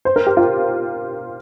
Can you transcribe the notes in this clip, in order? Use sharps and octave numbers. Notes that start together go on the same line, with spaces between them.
C5
A#4
G4
F4